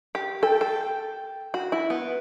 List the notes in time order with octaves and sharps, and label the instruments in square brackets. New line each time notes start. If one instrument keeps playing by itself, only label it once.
[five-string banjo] G4
[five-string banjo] A4 [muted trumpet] G5
[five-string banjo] A4
F#4
E4
B3